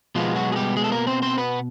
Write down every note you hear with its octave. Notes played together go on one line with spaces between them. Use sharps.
B2 F3 G#3 B3 F4
F#3 F#4
G#4
G3 G4
G#3 G#4
A4
A#3 A#4
C4 C5
C4 C5
B3 B4